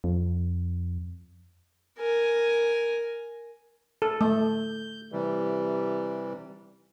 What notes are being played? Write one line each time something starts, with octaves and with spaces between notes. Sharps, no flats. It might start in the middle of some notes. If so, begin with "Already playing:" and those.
F2
A#4 G#5
A4
A3 G6
C3 E3 G3